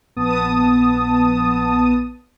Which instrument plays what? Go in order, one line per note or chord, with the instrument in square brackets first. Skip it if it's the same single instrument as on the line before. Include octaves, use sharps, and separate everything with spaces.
[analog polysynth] A#1 B3 A5 D#6